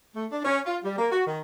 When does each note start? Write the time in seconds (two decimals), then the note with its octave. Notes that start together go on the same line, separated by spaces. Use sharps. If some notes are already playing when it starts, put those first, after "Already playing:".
0.15 A3
0.32 D4
0.45 C#4
0.66 F4
0.84 G3
0.98 A#3
1.12 F#4
1.26 D#3